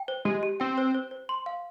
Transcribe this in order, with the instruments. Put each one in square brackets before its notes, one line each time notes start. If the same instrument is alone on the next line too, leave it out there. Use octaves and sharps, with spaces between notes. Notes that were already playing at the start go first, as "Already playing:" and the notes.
Already playing: [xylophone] G5
C5
[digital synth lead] G#3 [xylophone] G4
[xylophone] G4
[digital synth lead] C4 [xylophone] G5
[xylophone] C5
C5
C5
C6
F5